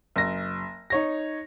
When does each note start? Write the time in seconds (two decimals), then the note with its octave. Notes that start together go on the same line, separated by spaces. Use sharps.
0.16 F#1 A#6
0.90 D#4 C#5 A#6